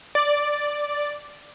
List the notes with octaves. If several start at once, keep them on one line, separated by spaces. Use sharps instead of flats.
D5